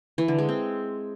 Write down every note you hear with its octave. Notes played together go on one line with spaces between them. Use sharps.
E3
D3
G#3
C4